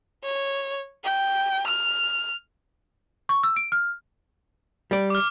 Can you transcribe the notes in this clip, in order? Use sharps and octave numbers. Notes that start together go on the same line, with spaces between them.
C#5
G5
F6
C#6
E6
D7
F6
G3 D5
D6 F6